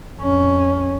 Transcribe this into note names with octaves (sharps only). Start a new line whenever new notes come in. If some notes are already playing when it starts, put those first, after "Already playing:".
F2 C#4